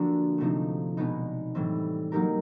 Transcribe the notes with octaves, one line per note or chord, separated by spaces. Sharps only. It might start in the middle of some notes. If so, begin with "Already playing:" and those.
Already playing: D3 F3 A#3 D4 F#4
C3 F3 A3 C4 D#4
B2 G#3 B3 D#4
A2 E3 G3 C4
F#3 A#3 D#4 G4 A#4